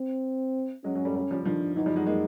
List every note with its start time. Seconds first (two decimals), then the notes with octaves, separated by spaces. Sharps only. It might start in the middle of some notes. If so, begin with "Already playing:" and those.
Already playing: C4
0.84 F#3 G#3 C#4
0.95 F#3 G#3
1.05 G3 A3
1.15 G3 A3
1.31 F3 G3
1.45 D#3 F3 D4
1.76 E3 F#3 D#4
1.86 F3 G3
1.96 F#3 G#3
2.06 G#3 A#3